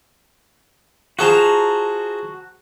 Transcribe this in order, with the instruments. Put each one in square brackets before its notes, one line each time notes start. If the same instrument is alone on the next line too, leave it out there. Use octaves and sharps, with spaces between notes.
[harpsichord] F4 G#4 C5 [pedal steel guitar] F#4 A5 A#5